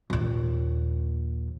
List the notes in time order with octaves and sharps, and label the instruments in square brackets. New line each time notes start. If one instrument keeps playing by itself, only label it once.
[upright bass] A#1 D#2